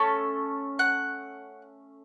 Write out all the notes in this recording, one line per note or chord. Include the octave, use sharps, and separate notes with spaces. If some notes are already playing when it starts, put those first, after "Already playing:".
Already playing: A3 C#4 A4
F#5 F#6